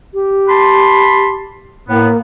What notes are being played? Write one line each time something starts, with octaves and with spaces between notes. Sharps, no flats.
G4
A5 B5 C6
A2 A#3 B3